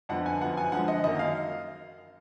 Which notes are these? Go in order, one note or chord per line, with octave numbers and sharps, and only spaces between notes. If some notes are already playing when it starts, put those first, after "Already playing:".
F2 D3 F3 B3 F#5
G#5
F#2 F3 B3 F#5
G#5
D3 F3 G#3 F#5
D#5
F#2 D#3 A#3 D#5
F5